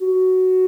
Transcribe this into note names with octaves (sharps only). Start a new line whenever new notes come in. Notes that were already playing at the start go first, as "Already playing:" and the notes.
F#4